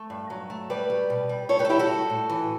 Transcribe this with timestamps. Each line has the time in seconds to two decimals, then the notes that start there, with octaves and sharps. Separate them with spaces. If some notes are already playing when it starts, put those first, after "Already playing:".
Already playing: A3
0.10 G2
0.30 F#3
0.50 A3
0.70 G3 B4 D5
0.90 G3
1.10 B2
1.29 G3
1.49 G3 A4 C#5
1.59 G4 B4
1.65 A4
1.69 G3 E4 G4
1.79 F#4 A4
1.89 G3
2.10 A2
2.29 E3